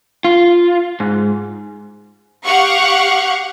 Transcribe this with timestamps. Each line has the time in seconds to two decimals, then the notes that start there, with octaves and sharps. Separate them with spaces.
0.24 F4
1.00 G#2
2.45 G4 F5 F#5 C#6